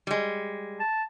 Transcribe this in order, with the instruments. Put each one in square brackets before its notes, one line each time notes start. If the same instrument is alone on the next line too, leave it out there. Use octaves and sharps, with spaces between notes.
[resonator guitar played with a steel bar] G3 G#3
[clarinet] A5